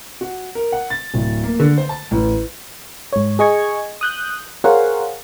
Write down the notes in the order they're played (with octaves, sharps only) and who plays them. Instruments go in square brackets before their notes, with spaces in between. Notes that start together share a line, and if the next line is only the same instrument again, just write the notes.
[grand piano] F#4
A#4
F#5
A6
D1
A#3
D3
C5
A5
A1
[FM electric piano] G#2 C#5
G#4 D#5 C#6 G#6
D#6 F#6 G6
G#4 A#4 C5 C#5 F5 F#5